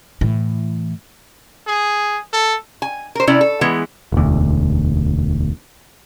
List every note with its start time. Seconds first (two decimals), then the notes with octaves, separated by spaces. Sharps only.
0.21 A2 E3
1.67 G#4
2.33 A4
2.82 G#5
3.15 A#4 C5
3.27 C3 C#4 E4 D5
3.41 A4
3.61 E3 G#3 B3
4.12 E1 D2